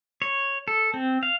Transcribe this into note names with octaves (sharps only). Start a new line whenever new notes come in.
C#5
A4
C4
F5